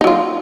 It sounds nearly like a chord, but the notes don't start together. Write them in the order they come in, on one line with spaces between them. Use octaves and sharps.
D#4 F#3 F4